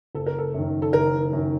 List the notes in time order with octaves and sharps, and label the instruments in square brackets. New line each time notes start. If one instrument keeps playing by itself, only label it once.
[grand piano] F#1 [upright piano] A4
[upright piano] A#4
A4
[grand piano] F#2 D#3
[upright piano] A4
[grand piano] F#1 [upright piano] A#4
[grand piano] F#2 D#3